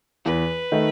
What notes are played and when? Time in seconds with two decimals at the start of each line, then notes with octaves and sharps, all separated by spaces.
0.25 E2 B4
0.72 D#3 A3 D#4